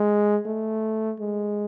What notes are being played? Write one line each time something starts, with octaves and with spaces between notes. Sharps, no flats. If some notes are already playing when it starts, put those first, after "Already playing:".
Already playing: G#3
A3
G#3